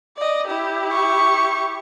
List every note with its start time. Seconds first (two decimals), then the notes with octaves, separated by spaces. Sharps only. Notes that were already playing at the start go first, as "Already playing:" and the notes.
0.17 D5 D#5
0.47 E4 G4
0.92 C#6